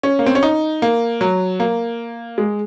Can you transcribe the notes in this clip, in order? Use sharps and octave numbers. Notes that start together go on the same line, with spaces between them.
C#4
A#3
C4
C#4
D#4
A#3
F#3
A#3
G#3